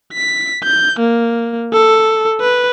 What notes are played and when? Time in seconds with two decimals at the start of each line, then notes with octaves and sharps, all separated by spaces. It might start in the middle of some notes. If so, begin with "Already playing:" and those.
0.13 B6
0.64 G6
0.99 A#3
1.73 A4
2.41 B4